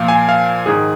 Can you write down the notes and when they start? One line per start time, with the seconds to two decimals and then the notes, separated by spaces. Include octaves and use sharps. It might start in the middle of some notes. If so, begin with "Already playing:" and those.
Already playing: A#2 F3 F5
0.08 G#5
0.29 F5
0.66 G#2 D#3 G#4